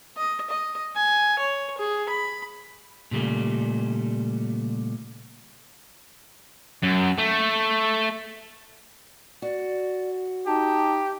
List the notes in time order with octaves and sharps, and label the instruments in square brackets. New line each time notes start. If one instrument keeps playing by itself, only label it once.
[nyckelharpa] D#5
D#5
G#5
C#5
G#4
B5
[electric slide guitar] A#2 C#3 G3 A3
[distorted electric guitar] F#2
A3
[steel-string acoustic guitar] F#4 [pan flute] D5
[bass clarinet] D#4 [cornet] G4 [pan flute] A5